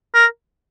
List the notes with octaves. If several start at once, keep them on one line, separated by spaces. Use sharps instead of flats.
A#4